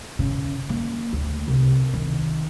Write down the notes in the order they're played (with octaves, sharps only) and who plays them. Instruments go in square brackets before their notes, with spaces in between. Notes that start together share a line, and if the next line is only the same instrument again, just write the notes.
[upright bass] C#3
A#3
D2
C2
D#3